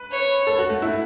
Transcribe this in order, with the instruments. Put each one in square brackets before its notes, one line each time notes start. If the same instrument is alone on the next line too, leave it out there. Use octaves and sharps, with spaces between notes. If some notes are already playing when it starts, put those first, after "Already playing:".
Already playing: [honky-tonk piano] B4
[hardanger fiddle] C#5
[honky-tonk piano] A4
F#4
A3
E4